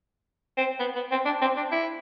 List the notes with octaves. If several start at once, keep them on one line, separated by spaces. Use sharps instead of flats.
C4
B3
B3
C4
D4
C4
D4
E4